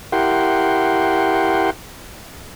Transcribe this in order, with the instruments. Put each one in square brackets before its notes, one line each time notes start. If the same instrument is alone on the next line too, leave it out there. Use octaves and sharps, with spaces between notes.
[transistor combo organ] E4 G4 A#4 F#5 G5 C6